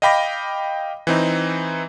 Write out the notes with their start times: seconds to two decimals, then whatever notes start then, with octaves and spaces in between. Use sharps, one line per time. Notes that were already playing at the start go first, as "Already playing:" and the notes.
0.02 D#5 F5 G5 B5 D6 A#6
1.07 E3 C4 D#4